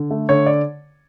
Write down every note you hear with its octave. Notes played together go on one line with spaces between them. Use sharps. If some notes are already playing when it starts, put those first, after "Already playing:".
Already playing: D3
A3
D3 C#5
D5